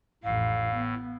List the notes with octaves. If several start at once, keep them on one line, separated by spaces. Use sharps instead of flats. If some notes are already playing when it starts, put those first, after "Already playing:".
A1 F2 A2 F5
B3